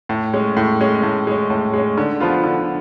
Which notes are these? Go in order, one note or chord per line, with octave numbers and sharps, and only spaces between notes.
A2
G#3 C#4
A2
G#3 C#4
A2
G#3 C#4
A2
G#3 C#4
D3
F3 B3 F4
D3